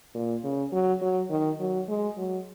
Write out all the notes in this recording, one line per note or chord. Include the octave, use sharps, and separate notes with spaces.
A#2
C#3
F#3
F#3
D#3
F#3
G#3
F#3